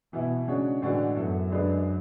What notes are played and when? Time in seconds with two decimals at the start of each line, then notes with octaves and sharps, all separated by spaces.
0.13 B2 E3 B3 E4
0.47 C#3 G#3 D4 F#4 C#5
0.82 A2 D3 E3 G#3 D4 F#4
1.16 F#2 B3 E4 A4
1.51 D3 G#3 D4 G#4 B4